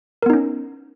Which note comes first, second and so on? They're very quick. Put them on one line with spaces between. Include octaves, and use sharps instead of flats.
A#4 B3 D#4 C#4